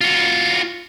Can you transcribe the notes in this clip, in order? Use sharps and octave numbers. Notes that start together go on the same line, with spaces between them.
F4 F#4